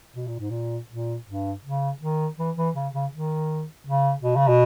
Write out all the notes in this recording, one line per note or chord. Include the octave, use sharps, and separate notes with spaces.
B2
A#2
G#2
A#2
A#2
G2
C#3
D#3
E3
E3
C#3
C#3
D#3
C#3
B2
C#3
B2